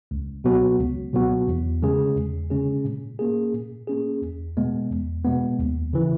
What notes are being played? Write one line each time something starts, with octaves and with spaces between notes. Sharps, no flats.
C#2
B2 F#3 B3 F#4
C#2
B2 F#3 B3 F#4
E2
C#3 G#3 C#4 G#4
E2
C#3 G#3 C#4 G#4
A#2
A#3 C#4 G#4
A#2
A#3 C#4 G#4
E2
B2 G#3 B3
E2
B2 G#3 B3
D#2
C#3 E3